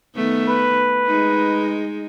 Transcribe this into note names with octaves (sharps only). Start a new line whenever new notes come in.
D#3 A3 B3
B4
G#3 D#4